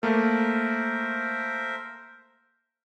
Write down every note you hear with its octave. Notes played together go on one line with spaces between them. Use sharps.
A3 A#3 A#4 C5 E5